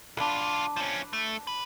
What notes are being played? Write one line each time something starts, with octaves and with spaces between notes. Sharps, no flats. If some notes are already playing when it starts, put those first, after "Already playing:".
B1 D4 F4 B4
F3 C#4
A3
B4